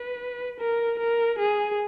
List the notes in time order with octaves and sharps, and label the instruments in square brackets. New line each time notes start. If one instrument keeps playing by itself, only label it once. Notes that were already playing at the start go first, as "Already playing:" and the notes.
Already playing: [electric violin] B4
A#4
A#4
G#4